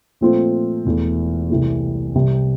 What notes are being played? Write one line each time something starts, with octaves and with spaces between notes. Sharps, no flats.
A#2 F3 A3 C4 F4
E1 E2 E3 A3
C2 C3 E3 A3
C2 C3 G3